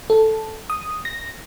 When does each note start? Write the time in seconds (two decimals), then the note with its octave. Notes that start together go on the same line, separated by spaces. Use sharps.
0.10 A4
0.70 D#6
1.05 A#6